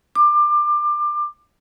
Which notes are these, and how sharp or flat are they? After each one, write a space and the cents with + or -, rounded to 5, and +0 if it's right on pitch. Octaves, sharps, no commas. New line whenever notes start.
D6 +25